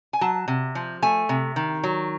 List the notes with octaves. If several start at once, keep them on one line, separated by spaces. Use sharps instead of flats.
G#5
F#3 A5
C3
F3
A3 G#5
C3
D#3
F#3